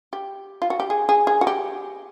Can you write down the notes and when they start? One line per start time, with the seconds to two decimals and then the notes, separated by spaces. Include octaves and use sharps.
0.13 G4
0.62 F4
0.70 F#4
0.80 G4
0.90 G#4
1.09 G#4
1.27 G#4
1.41 F#4
1.47 G4